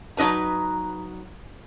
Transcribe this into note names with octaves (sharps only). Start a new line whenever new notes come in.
F#3 D#4 B4 A#5